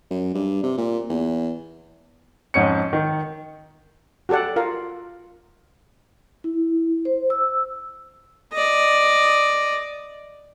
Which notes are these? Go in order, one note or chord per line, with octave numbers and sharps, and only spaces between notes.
F#2
G2
C3
A#2
E2
F2 G#2 C#4 C#7
D#3
F#4 G4 A4 D5 F#5
F4 A#4 F5
E4
C5
E6
D5 D#5